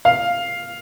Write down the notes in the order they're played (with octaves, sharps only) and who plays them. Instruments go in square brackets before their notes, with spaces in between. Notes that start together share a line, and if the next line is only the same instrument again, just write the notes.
[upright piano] F5